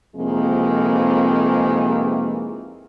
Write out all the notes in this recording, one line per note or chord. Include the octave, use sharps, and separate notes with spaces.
F2 C3 D#3 E3 G#3 A#3